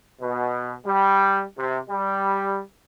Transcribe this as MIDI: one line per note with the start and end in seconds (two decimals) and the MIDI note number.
0.21 0.74 47
0.86 1.44 55
1.58 1.79 48
1.90 2.62 55